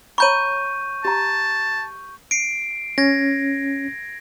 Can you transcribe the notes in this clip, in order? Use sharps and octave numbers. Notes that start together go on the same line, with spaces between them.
C#5 A#5 B5 C#6 G6 D#7
G4 A5 A#5
C7 D7
C#4 G#6 A#6